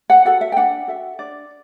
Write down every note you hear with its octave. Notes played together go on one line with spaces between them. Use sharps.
F#5
F#4 A4 F#5
E5
G5
D4 F#5
F#4 A4 E5
D4 D5